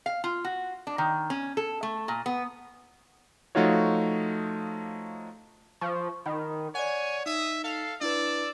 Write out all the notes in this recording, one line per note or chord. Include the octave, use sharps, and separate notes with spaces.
F5
F4
F#4
D4
D#3
C#4
A4
A3
A#2
B3
F3 A3 D#4 F4 F#4 C#5
F3 C#6
D#3 B5
C#5 D5 F#5 G#5
D#4 E5 D#6
A4 F5
D4 E4 B4 D5 E6